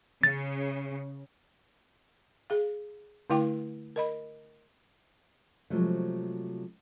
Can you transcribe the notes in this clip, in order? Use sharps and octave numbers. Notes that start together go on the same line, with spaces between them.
C#3 A6
G#4 F5
D3 A3 E4 F5 G5 D6
A#4 D#5 B5
C3 F3 F#3 G#3 A3